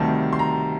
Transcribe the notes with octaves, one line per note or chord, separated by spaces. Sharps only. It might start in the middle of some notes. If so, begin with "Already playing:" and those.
Already playing: D2 C3 D#3 G3 A5
C6
A#5